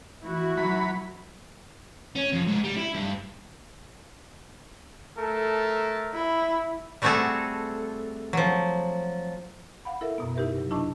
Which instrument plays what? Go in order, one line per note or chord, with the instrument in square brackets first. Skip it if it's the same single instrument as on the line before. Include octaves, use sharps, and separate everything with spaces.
[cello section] E3 E4 F#4
[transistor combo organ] F#3 B5
[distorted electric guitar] C#4
F2
G#2
G3
E4
G2
[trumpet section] A3 A4 A#4
[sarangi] E4
[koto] G3 A3 C4 F#4 G#4 A4
F3 F#3
[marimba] F5 F#5 B5
E4 A4 A#4 E5
F#2 B2 B3
D#4 E4 G4 A#4 B4 E5
C3 F#3
D4 E4 D#5 A5 C#6